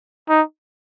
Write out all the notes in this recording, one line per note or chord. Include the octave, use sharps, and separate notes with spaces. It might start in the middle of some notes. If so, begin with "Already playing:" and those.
D#4